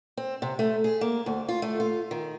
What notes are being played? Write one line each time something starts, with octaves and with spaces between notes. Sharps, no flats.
C4
C3
A3
G#4
A#3
D2
F4
A3
F4
D#3